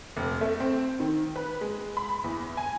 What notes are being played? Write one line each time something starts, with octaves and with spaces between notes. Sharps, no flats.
F1
A3
C4
D#3
B4
G#3
B5
E2
G#5